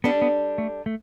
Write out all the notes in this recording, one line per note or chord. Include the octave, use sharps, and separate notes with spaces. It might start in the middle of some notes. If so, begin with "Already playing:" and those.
G3 B3 D4 A4
B3
A3
A3